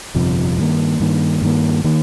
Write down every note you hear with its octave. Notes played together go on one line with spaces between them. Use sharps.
G1 F2 C3 F3
G2 D#3 A#3
G2 D#3 A#3
G2 D#3 A#3
D#3 A#3